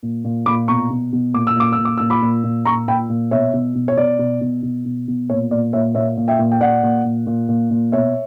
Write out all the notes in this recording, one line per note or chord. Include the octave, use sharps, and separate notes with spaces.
A#2
A#2
A#2 B5 D6
B2 A#5 C#6
B2
B2
A#2 D6
E6
A#2 D6
E6
A#2
D6
A#2 E6
B5 D6
A#2
A#2
A#2 A#5 C#6
A#2 G5 B5
A#2
B2 C#5 E5
B2
B2
C#5
B2 D5
B2
B2
B2
B2
B2
A#2 C#5
A#2 D5
A#2 C#5 E5
A#2 C#5 E5
A#2
E5 G5
A#2
G5
A#2 D5 F#5
A#2
A#2
A#2
A#2
A#2
B2 C#5 E5